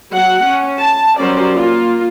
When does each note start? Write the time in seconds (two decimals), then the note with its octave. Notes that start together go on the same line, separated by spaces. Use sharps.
0.13 F#3 F#5
0.46 C#4
0.78 A5
1.19 F#3 G3 C#4 A#4 C5 D5
1.56 A#3 F4